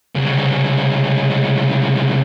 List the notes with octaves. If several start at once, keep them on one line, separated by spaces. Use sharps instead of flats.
C2 C#3